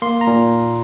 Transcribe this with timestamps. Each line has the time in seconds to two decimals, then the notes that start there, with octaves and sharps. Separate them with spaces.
0.02 A#3 C6
0.21 A#5
0.27 A#2